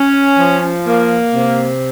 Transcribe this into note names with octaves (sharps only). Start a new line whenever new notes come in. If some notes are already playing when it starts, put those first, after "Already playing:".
Already playing: C#4
F3
A#3
C3